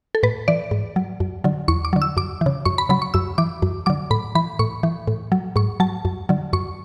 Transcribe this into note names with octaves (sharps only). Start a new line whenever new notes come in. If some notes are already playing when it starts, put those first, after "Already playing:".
A4
A2 B4
E3 D5
G#2
F#3
F#2
D3 F#3
E2 C#6
D6
D3 F#3
E6
F#2 D6
C#3 E3
F#2 C#6
B5
C#3 F#3 B5
C#6
F#2 E6
E3 D6
F#2
D3 F#3 D6
A2 B5
E3 B5
A2 C#6
E3
A2
F#3
G#2 C#6
F#3 A5
F#2
D3 F#3
F#2 C#6